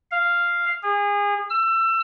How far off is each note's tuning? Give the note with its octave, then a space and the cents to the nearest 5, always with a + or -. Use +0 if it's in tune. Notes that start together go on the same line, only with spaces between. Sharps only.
F5 -5
G#4 -30
E6 +25